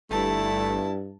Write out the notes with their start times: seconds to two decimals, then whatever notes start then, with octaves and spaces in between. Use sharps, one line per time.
0.11 G1 G2 A3 E4 A5